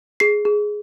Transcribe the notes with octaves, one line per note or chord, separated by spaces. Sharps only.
G#4 C7
G#4